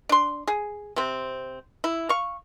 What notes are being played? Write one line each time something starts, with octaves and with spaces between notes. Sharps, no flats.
D4 C6
G#4
C3 C4
E4
F5 C#6